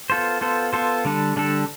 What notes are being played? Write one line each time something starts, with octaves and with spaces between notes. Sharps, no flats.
B3 F4 A4 C5
B3 F4 A4 C5
B3 F4 A4 C5
D3 G3 D4 A4
D3 G3 D4 A4